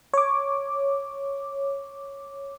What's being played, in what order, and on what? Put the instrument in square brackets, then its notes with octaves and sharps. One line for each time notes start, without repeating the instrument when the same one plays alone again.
[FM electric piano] C#5 D6